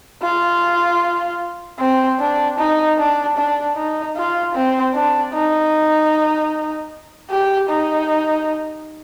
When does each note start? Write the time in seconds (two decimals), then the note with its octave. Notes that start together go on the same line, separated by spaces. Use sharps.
0.23 F4
1.79 C4
2.20 D4
2.58 D#4
2.98 D4
3.37 D4
3.76 D#4
4.16 F4
4.55 C4
4.94 D4
5.33 D#4
7.31 G4
7.70 D#4